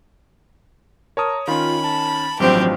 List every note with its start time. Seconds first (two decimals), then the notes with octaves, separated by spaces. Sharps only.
1.17 A#4 C#5 A5 D#6
1.48 D#3 C#4 F4 B5
1.84 A5
2.40 A1 G2 F3 F#3 C4 G4